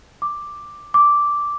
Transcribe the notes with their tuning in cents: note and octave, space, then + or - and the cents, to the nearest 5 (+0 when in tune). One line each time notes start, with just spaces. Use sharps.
D6 +5
D6 -5